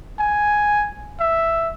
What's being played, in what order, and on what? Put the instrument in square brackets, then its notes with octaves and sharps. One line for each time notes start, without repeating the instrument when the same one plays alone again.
[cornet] G#5
E5